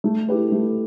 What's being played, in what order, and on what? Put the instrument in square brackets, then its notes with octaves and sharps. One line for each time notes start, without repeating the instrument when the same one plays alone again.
[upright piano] A3
E4 G4 B4
A3